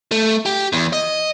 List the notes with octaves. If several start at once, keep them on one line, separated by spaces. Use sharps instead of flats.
A3
G4
E2
D#5